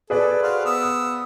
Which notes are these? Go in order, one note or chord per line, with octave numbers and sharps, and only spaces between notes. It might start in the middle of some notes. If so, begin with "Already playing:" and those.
G#4 A4 B4 D5
F#4 C5 F5
B3 D#6 E6